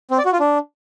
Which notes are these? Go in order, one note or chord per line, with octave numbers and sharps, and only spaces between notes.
C4
D5
F#4
F4
D4